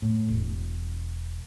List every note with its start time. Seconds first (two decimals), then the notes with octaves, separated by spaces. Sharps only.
0.02 A2
0.29 E1